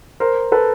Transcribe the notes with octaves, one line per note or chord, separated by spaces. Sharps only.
A#4 C5
A4 B4